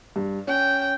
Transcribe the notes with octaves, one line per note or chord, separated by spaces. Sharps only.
G2
C#4 G5